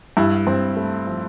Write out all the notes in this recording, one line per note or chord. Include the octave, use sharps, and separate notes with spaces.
G2 E4
G2 C4
A3
F3